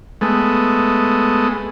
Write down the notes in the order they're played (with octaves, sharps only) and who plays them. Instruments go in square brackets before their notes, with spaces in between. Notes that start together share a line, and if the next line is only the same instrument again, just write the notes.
[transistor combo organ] G#3 A3 B3